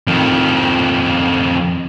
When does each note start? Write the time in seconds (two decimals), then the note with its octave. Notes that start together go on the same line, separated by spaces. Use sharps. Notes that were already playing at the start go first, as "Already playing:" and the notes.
0.07 F2 D#3